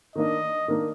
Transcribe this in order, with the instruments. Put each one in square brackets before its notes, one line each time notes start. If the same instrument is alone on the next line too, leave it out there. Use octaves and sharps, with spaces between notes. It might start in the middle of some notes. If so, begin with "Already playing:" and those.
[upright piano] D#3 A#3 D4 [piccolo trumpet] D#5
[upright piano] D#3 A#3 D4